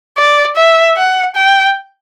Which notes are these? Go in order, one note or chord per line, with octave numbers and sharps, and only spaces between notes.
D5
E5
F#5
G5